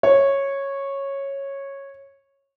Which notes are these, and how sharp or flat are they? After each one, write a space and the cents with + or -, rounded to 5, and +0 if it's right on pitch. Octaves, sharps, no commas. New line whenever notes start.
C#5 -10